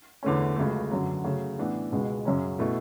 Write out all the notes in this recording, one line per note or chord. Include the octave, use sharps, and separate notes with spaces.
E2 D3 A3 C#4
C#2 C#3 F#3 A3
F#2 D3 F#3
C#3 F#3 A3
A2 E3 B3 D4
C#2 B2 G#3 B3
F#2 C#3 F#3 C#4
B2 A3 E4